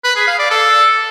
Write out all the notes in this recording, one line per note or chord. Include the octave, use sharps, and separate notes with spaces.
B4
G#4
F5
D5
A4